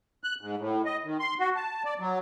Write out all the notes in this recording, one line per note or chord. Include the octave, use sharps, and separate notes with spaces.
F#6
G#2
A2
D#5
D#3
C6
F#4
A5
D5
F#3